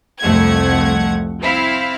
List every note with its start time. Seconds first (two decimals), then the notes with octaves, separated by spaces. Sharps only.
0.19 C2 F2 F3 A3 F#5 G#6
1.41 C4 E4 F5